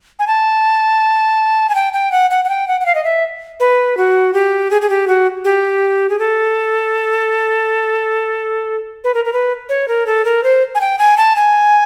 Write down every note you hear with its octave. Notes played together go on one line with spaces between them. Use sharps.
G#5
A5
G#5
G5
G5
F#5
F#5
F#5
G5
F#5
F#5
F5
D#5
E5
B4
F#4
G4
G#4
G#4
G4
F#4
G4
G#4
A4
B4
A#4
A#4
B4
C#5
A#4
A4
A#4
C5
G#5
G5
G#5
A5
G#5